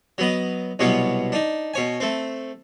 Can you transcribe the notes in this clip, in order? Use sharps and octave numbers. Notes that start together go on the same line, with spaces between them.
F#3 B3 D#5
C2 B2 F#3 B3 C#5
D4 D#4
B2 C#5 G#5
A3 C4